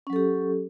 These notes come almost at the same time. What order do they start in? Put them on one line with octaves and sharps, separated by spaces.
C#4 F#3 A4 G4